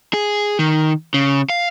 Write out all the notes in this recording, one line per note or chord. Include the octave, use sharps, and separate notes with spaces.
G#4
D#3
C#3
F5